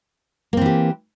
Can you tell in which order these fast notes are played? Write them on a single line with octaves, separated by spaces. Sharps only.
A#3 C4 E3 G4